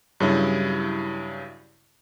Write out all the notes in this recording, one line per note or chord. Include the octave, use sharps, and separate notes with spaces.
G2 C#3 F#3 G3 E4